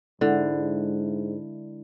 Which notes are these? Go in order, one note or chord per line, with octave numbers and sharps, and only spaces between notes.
G#2 D3 G#3 D4 E4